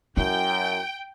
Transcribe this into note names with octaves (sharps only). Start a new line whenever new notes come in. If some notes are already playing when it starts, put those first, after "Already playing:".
F#2 E4 G5